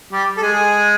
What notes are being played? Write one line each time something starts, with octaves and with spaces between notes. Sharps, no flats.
G3 G4
A4
G#3 G#4